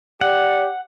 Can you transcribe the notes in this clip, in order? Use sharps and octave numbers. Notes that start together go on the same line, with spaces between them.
G4 D5 F#5